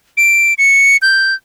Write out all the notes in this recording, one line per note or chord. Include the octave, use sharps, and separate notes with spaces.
D7
C#7
G6